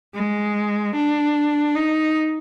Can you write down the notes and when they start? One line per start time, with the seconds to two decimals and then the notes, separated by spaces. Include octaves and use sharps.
0.14 G#3
0.95 D4
1.75 D#4